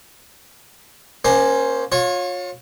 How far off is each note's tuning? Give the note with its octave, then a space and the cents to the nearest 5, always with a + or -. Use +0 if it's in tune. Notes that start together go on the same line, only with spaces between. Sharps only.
A#3 +35 C#4 +0 C5 +5
F4 +30 C#5 -10